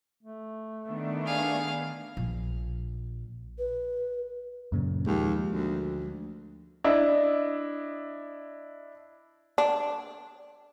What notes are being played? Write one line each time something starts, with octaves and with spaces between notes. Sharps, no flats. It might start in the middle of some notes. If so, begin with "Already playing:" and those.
A3
D#3 B3 D4
G#4 F5
A#1
B4
F#2 A#2 C#3
D#2 F3 G#3
D2
D4 E4 D#5
D4